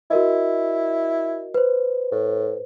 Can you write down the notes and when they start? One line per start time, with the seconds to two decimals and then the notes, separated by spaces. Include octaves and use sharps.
0.11 E4 F#4 A#4 D#5
1.54 B4 C5
2.12 A2